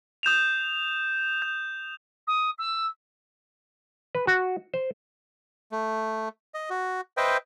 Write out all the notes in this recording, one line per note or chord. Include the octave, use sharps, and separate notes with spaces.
D#6 G6 E7 F7
G6
D#6
E6
B4
F#4
C5
A3
D#5
F#4
B4 C5 D#5 E5 G5